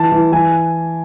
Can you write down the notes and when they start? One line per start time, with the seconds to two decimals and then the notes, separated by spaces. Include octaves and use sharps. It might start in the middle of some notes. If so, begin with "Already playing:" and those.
Already playing: E3 A5
0.12 E3
0.32 E3 G#5